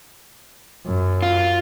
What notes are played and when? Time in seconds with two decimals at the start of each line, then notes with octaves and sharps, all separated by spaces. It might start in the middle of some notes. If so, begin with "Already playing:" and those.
0.87 F#2
1.23 F4